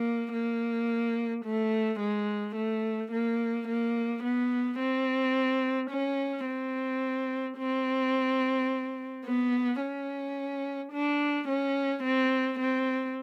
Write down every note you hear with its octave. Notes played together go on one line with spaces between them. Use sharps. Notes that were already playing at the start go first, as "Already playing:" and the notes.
Already playing: A#3
A#3
A3
G#3
A3
A#3
A#3
B3
C4
C#4
C4
C4
B3
C#4
D4
C#4
C4
C4